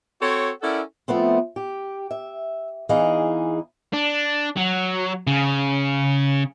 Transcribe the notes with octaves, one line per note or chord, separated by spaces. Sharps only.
C4 F#4 A4 C#5
C#4 E4 A4 A#4 D5 F#5
F3 A3 B3 C4
G4
E5
E2 E3 D#4 G#4 D#5 F5
D4
F#3
C#3